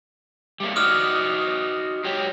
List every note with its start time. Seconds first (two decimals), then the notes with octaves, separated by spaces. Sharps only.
0.60 G3 A3 A#3
0.76 D#4 F#4 D5 D#6 F6
2.05 F#3 G4